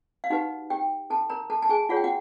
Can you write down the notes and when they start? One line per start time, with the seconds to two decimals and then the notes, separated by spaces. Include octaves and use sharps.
0.24 F5
0.30 D#4 F#4 G4 B4 F#5
0.70 G4 G5
1.10 A4 A5
1.30 A#4 A#5
1.50 A4 A5
1.62 A5
1.69 G#4 G#5
1.89 F4 G#4 C#5 F#5
1.97 G5
2.04 F#4 F#5